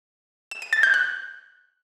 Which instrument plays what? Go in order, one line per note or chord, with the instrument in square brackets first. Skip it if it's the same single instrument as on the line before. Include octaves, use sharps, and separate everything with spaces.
[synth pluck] E7
D#7
A6
G6
F#6